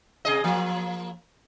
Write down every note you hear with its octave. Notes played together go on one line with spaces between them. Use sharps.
C3 G#4 D#5
F3 A#3